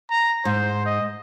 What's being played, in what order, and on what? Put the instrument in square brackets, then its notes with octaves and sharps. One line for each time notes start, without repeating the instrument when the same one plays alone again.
[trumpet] A#5
[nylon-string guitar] G#2 [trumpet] C5
[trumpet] D#5